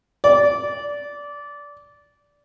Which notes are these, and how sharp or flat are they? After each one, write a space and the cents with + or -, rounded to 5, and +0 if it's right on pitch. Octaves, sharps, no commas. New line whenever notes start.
D5 -20